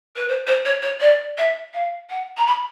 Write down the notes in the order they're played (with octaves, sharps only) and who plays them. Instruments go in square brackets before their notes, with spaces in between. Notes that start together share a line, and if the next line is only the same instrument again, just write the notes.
[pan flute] B4
C5
C5
C#5
C#5
D5
E5
F5
F#5
A#5
B5